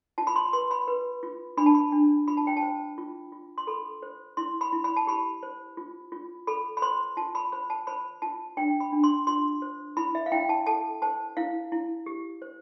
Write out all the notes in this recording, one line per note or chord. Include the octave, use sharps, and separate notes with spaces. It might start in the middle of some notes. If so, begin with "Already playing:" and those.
F4 A5
B5
C6
B4 C6
B5
B4
F4
D4 B5
A5
B5
D4
F4 B5
A5
G5
A5
C5
F4
F4
C6
A4 B5
C5
E4 C6
B5
E4
B5
A5
G4 B5
C5
F4
F4
A4 B5
B5
C5 C6
F4 A5
B5
C5 B5
A5
C5 B5
F4 A5
D4 G5
B5
D4
C6
F4 C6
C5
E4 B5
E5
F5
E4 G5
A5
A4 A5
C5 A5
E4 F5
E4
G4
C5